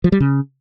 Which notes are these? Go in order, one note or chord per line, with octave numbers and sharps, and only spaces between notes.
F3
G3
C#3